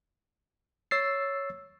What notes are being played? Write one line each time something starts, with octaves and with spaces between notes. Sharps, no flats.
C#5 E6 A6 C7